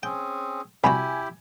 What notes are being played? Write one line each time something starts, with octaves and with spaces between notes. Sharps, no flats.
C4 C#4 G#4 G5
C3 G3 E4 F#4 G4 G#5 B5